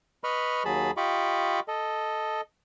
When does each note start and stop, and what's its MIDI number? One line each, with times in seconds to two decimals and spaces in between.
0.24 0.63 71
0.24 0.63 75
0.24 0.63 83
0.24 0.63 85
0.24 0.63 89
0.65 0.91 39
0.65 0.91 54
0.65 0.91 68
0.65 0.91 81
0.65 0.91 83
0.97 1.60 65
0.97 1.60 67
0.97 1.60 75
0.97 1.60 83
0.97 1.60 85
0.97 1.60 86
1.68 2.41 69
1.68 2.41 75